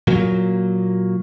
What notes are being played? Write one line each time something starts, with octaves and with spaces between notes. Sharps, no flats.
A#2 F#3 A#3